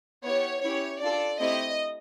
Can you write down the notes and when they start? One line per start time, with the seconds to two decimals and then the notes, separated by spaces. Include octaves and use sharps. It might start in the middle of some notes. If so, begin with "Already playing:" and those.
0.25 B3 E4 G4 C#5
0.63 C#4 E4 G4 C#5
1.02 D4 F4 A4 D5
1.40 A3 C4 E4 G4 D#5